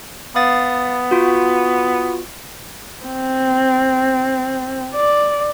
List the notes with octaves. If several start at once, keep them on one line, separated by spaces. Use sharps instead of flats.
B3 F5 D#6 A6
F4 F#4
C4
D5